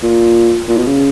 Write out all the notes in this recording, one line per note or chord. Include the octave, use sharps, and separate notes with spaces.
A#2
A#2
B2
C#3